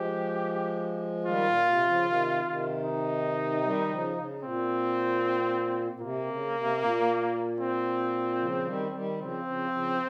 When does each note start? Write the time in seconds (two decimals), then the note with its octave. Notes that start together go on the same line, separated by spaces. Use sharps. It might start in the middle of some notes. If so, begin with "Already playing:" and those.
Already playing: F3 G#3 G4
1.26 D#3 G3 F4
1.46 A#2
1.66 C3
1.85 C#3 F3
2.04 C3 D#3
2.44 C3 D#3
2.84 D#4
3.63 D#3 G3
3.90 C#3 F3
4.17 C#3
4.43 A#2 C4
5.92 A#2
6.01 C3 A#3
6.28 C#3
6.54 C3
6.80 A#2
7.60 C4
8.39 C#3 F3
8.65 D#3 G3
8.92 D#3 G3
9.19 C#3 F3 C4
9.45 C#3 F3
9.71 C#3 F3